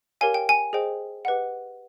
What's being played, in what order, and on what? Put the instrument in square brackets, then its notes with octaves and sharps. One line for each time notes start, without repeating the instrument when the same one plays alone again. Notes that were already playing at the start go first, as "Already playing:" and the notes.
[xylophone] G4 A#4 C#5 F5 G#5
G5
G#5
G#4 C5 D#5 G5
G4 B4 D#5 F#5